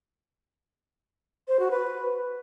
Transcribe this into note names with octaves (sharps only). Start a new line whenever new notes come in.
C5
F#4
B4